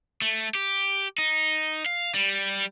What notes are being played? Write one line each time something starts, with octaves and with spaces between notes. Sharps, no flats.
A3
G4
D#4
F5
G3